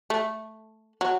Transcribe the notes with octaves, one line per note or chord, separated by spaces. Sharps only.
A3
F#3